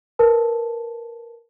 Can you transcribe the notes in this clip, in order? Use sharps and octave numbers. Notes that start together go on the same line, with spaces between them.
A#4 B4 A5